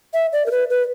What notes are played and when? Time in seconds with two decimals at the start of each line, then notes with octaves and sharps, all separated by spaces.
0.14 E5
0.33 D5
0.46 A#4
0.51 B4
0.70 B4